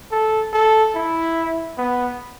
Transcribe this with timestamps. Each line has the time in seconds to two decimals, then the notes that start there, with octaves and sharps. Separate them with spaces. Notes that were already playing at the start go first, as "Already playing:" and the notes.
0.12 A4
0.53 A4
0.95 E4
1.78 B3